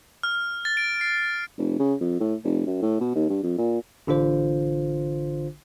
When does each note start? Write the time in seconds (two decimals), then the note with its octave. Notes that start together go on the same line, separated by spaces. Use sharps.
0.23 F6
0.65 A6
0.77 D7
1.01 C7
1.58 F1
1.79 C#3
2.01 F2
2.20 A2
2.44 F1
2.67 F#2
2.82 A2
3.00 B2
3.15 D#2
3.29 G2
3.43 F2
3.58 A#2
4.07 A1 D3 D4 F4 C5